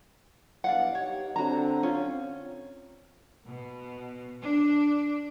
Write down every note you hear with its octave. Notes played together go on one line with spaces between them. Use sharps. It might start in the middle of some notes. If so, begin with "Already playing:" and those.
G2 B2 E4 D5 F5 F#5
D#4 G4 C#5
D3 C4 F#4 A#5
C#4 F4
B2
D4